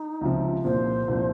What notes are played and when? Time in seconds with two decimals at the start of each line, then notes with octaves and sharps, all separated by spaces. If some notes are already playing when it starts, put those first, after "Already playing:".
Already playing: D#4
0.21 C#2 C3 F3
0.64 C2 A#2 F3 C5
1.08 C2 A#2 F3